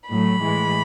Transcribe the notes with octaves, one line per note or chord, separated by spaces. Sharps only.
A2 F#3 A3 B5
A2 E3 G#3